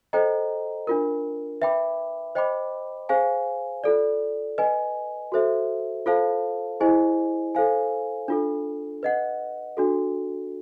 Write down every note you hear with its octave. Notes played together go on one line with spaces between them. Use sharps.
A4 C5 D#5 G5 A#5
D4 F4 A#4
B4 E5 G5 B5 D6
C5 D#5 G5 B5 D6
G#4 C5 F5 G#5
F4 A4 D5
B4 D#5 G#5
F#4 A4 C5 E5
F4 A4 C5 F5 A5
E4 G#4 C5 D#5 G#5
A4 C5 F5 G#5
D4 F4 A4
B4 D#5 F#5
D4 F#4 A4